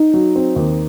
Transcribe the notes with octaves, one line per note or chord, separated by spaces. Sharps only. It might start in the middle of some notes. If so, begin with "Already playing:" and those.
Already playing: D#4
F#3
C4
D#2